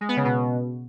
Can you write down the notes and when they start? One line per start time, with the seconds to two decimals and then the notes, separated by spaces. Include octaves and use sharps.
0.01 G#3
0.09 B3
0.17 C#3
0.25 B2